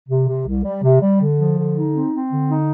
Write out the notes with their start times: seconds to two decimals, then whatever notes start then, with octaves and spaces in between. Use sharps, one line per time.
0.09 C3
0.28 C3
0.46 C2
0.64 G3
0.83 C3
1.01 G3
1.20 D3
1.39 F3
1.57 D3
1.75 D#4
1.94 C4
2.13 C4
2.30 D3
2.49 D#4